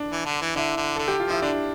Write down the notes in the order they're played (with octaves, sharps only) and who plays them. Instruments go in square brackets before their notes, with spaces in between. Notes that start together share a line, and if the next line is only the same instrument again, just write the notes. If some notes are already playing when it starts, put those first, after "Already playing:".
Already playing: [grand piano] D4
[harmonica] E3
D3
E3
[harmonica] D3 [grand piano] E4
[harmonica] D3
[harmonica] D3 [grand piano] A4
[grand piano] G4
F4
[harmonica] F3 [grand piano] E4
[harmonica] D3 [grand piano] D4